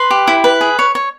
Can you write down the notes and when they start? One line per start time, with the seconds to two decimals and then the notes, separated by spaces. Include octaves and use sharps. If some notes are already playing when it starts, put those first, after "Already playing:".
Already playing: B4 C6
0.10 G4
0.28 E4
0.44 B4
0.61 G#4
0.79 C#5
0.95 C#5